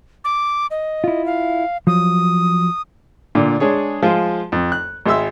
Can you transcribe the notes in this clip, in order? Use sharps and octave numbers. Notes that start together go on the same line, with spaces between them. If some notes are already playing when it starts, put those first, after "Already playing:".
D6
D#5
E4 F4
F5
F3 F#3 D#6
A#2 D3
G#3 D4 G#4 C#5
F3 G#3 F4
F2
F#6
G#1 G#3 E5 E6